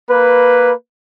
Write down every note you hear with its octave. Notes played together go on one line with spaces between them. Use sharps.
A#3 B4